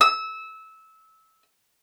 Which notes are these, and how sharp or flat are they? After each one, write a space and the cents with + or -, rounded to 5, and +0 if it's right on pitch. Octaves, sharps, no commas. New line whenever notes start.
E6 -20